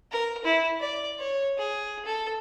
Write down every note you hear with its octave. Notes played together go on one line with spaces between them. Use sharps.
A#4
E4
D5
C#5
G#4
A4